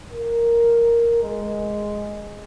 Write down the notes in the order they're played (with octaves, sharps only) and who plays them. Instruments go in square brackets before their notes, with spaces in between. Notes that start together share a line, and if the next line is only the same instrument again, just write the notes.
[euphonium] A#4
G#3